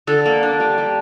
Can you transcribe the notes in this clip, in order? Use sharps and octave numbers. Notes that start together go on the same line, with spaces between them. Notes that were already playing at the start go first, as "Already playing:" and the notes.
D3 A4
A#3
D4
G3
G3